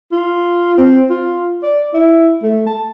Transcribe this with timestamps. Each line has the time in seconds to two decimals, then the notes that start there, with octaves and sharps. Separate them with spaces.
0.12 F4
0.77 C4
1.10 F4
1.63 D5
1.94 E4
2.42 A3
2.66 A5